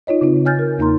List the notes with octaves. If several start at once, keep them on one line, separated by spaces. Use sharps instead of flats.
D#4 F4 C#5 D#5
C#3 C4 D#4
C#5 G#5 F6 G6 A6
A#4
E2 A#3 D#4 A#5 C6